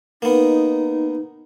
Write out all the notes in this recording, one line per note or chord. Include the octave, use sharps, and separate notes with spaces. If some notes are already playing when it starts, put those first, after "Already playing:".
A#3 B3 D#4